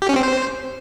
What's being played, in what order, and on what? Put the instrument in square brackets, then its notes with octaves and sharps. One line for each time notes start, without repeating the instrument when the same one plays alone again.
[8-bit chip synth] G4
C#4
C4
C5